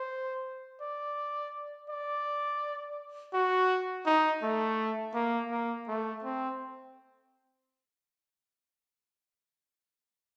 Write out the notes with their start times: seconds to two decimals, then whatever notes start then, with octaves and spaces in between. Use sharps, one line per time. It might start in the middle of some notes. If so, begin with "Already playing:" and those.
Already playing: C5
0.81 D5
1.89 D5
3.34 F#4
4.06 D#4
4.42 A3
5.14 A#3
5.51 A#3
5.88 A3
6.24 C4